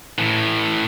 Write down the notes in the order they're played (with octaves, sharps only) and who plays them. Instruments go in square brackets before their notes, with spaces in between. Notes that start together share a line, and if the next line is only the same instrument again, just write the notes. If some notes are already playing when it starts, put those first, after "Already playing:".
[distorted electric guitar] A2 E3